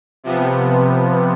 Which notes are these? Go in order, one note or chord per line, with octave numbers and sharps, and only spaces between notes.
C3 F3 B3